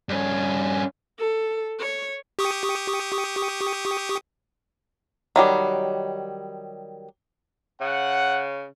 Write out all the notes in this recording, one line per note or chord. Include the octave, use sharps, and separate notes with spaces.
G2 C#4
A4
C#5
G4 C#6 D#6
D#3 F#3 G3
C#3 F#5